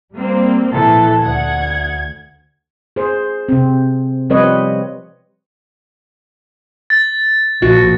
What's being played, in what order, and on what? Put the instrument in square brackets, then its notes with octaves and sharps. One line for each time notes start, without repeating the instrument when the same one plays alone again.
[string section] G3 A#3 C4
[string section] A#1 [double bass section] E3 [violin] A4
[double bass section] D2 [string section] F#5 [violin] G#6
[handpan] G#4 C5
C3 C4
F3 G3 C4 B4 C#5 D#5
[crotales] A6
[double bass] A#1 F3 [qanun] F#4